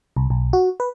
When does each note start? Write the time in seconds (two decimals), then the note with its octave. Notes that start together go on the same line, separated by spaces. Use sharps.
0.17 C2
0.30 B1
0.53 F#4
0.80 B4